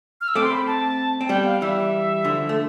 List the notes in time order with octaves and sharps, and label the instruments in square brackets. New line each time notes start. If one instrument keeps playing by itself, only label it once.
[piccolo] F6
E6
[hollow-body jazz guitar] A3 C4 [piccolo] D6
[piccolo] C6
B5
A5
[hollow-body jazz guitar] C4
[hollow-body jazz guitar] G3 B3 [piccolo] G5
[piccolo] F5
[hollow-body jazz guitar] E3 G3 [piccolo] E5
[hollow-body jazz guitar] D3 F3
A3